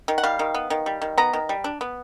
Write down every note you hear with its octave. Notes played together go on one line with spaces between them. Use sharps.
D#3
F#5
G3 F5
D#3
B3
D#3
G3
D#3
B3 A#5
D#3
G3
D4
B3